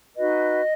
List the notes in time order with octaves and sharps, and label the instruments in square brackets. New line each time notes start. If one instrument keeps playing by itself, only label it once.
[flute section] D#4 F#4 B4 D#5